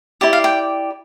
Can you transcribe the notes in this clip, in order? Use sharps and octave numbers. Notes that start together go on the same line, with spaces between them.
E4 G4 D5
F5
G5